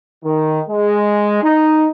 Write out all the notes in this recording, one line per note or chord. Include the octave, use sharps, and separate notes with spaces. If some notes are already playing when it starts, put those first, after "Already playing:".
D#3
G#3
D#4